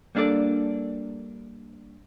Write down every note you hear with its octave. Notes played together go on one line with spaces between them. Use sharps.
G3 A#3 D4 A4 D5